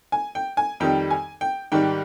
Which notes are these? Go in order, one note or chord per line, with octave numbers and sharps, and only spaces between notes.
G#5
G5
G#5
F2 D#3 G3 G5
G#5
G5
G#2 D#3 G3 G5